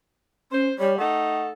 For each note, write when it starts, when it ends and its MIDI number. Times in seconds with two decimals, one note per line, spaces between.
0.52 0.68 61
0.52 0.72 72
0.79 0.98 55
0.79 0.98 73
0.98 1.50 57
0.98 1.50 63
0.98 1.50 69
0.98 1.48 78